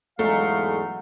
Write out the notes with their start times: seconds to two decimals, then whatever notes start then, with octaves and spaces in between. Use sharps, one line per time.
0.19 E2 G#2 F#3 G#3 A3 F5